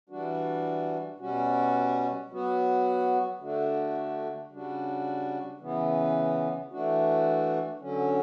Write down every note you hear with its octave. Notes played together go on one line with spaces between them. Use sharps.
E3 G3 D4 F#4
B2 G3 C#4 F#4
F#3 B3 F#4
D3 A3 D4 F#4
C#3 G3 D4 F#4
C#3 E3 B3
E3 A3 D4 F#4
D3 F#3 C#4